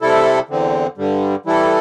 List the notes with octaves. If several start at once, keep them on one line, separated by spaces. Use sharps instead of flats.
C3 G3 E4 A4
E2 D3 C4
G2 D3 G3
E3 G3 E4 A4